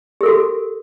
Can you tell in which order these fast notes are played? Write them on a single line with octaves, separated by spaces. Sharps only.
G4 A#4 A4 F#4